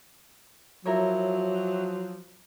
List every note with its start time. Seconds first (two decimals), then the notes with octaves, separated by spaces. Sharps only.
0.86 F3 F#3 E4 A#4 C#5